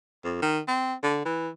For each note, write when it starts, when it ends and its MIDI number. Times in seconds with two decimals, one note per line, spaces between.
0.24 0.40 41
0.42 0.59 51
0.68 0.94 60
1.03 1.22 50
1.25 1.49 52